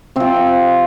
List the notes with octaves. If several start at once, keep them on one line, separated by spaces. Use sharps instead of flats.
C3 F3 C4